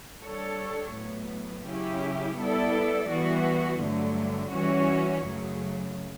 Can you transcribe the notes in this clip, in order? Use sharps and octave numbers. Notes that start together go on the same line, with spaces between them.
G3 D4 A4 C#5
A2 F#3 B3
C#3 F#3 C#4 E4 G4
G3 B3 E4 A4 D5
E3 G3 B3 F#4
G2 D3 F#3 A3
E3 G3 C#4 F#4 C#5
F#2 C#3 F#3 A3